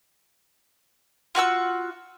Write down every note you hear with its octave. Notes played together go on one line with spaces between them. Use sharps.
F4 F#4 F#5 E6